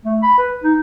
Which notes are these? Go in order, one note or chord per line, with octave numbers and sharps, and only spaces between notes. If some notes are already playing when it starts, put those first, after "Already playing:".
A3
B5
B4
D#4